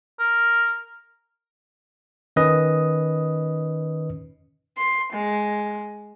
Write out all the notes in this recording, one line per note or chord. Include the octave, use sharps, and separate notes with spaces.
A#4
D#3 C#4 B4 D#5 D#6
C6
G#3